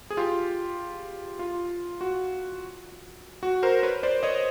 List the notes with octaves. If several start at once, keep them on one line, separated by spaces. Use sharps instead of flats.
G#4
F4 G4
F4
F#4
F#4
A#4 C5
B4 C#5
C5 D5
C#5 D#5